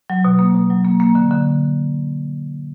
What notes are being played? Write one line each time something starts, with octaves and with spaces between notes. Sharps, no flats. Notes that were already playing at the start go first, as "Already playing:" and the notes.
F#3
B2
A#3
B2
F#3
A#3
A#3
D3
D3